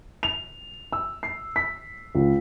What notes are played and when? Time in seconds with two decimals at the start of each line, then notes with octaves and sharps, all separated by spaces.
0.23 F7
0.92 E6
1.23 C7
1.56 B6
2.15 C#2